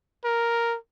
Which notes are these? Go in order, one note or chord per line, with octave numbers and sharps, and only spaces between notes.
A#4